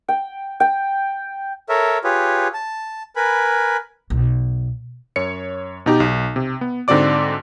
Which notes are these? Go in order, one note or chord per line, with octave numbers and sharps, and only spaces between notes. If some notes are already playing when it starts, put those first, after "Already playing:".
G5
G5
A4 A#4 C#5 E5
F4 G4 G#4 B4 C#5
A5
A#4 B4 G#5 B5
B1
F#2 C#5 C#7
B2 D#4 G4
B1
C3
B3
G#2 D3 C4 F#4 D5 D6